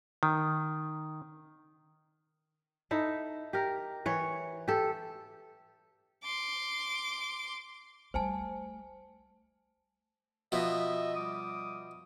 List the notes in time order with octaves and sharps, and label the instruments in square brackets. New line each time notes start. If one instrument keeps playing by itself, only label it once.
[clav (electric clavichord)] D#3
[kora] D#4 E4 A4
G4 A#4
E3 C#5
G4 A4
[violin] C6 D6
[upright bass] G3 A3 [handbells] C5 G#5 A5
[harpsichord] B2 F3 [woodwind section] D#5 E5
[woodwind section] G3 D6 D#6